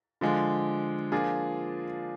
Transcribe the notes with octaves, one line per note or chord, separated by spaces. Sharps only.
D3 F3 G#3
F3 A#3 D4 F4 G#4